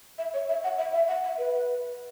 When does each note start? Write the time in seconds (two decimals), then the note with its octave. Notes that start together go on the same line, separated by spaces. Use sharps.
0.18 E5
0.34 C#5
0.49 E5
0.64 F#5
0.78 E5
0.93 E5
1.08 F#5
1.23 E5
1.38 B4